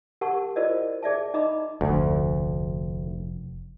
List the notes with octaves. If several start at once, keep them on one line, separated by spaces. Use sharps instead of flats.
G4 A#4 F#5 A5 C#6
E4 F4 A#4 C5 D5 D#5
G#4 D5 E5 A5
D#4 D#5 A#5 B5 D6
F1 D2